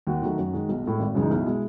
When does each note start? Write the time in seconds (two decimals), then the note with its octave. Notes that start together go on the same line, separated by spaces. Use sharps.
0.07 D#2 F#4
0.22 D#3 F#3 A3
0.38 F#2
0.53 D#3 G#3
0.69 B1
0.84 A2 G#3
1.00 G#1
1.15 F#2 C#3 E3 G#3
1.22 D#4
1.30 B1 E4
1.46 B2 G#3